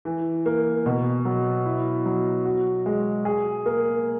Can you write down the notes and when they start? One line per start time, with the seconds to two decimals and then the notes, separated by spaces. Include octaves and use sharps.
0.05 E3
0.46 A#3
0.86 B2
1.25 F#3
1.66 E4
2.06 F#3
2.45 F#4
2.86 G#3
3.25 G#4
3.66 A#3